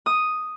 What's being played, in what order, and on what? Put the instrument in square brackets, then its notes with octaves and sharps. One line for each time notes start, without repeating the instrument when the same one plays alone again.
[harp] D#6